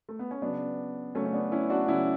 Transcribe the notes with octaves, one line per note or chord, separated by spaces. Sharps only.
A3
B3
C#4
C#3 F#3 B3 D4
C#3 F#3 A3 C#4
C#4
B3 D4
C#4 E4
D4 F#4
C#3 F#3 C#4 E4